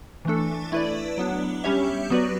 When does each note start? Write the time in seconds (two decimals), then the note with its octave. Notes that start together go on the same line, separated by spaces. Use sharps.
0.25 E3 A3 D4 A4
0.72 A3 E4 B4 D5
1.18 F#3 B3 D4
1.64 G3 C#4 G4 C#5 E5
2.10 F#3 B3 F#4 B4 D5